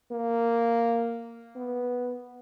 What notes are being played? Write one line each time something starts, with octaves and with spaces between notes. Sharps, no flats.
A#3
B3